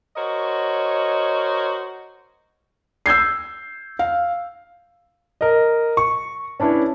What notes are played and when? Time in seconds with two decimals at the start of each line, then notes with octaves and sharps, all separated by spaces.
0.16 F#4 A#4 C5 C#5 D#5
3.06 E6 G6 G#6 C7
3.99 F5
5.41 A#4 D#5
5.97 C#6
6.60 C#4 D4 E4 B4 C#5